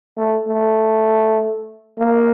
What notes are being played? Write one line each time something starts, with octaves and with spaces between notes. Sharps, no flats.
A3
A3
A#3